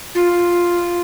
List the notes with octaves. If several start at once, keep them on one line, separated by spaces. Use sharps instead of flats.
F4